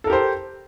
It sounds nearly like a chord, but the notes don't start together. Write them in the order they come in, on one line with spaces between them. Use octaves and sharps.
A4 A#4 G4 C5